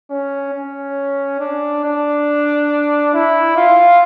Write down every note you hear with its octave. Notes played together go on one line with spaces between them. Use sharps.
C#4
C#4
D4
D4
E4
F4